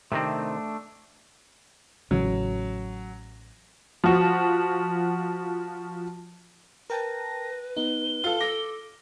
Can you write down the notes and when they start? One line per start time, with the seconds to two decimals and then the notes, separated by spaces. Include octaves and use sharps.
0.12 C3 D#3 A3 C4 D4
2.11 A1 C#3 F#3
4.04 F3 F#4
6.90 A#4 B4 G5 A5 A#6
7.77 B3 D#4 G7
8.24 F4 A4
8.41 A4 D6 A#6